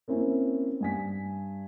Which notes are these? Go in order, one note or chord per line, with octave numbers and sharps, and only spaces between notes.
A#3 C4 C#4 E4
G2 G#5 B6